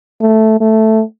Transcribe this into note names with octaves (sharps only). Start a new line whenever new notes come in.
A3
A3